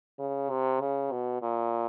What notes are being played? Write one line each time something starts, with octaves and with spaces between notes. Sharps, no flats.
C#3
C3
C#3
B2
A#2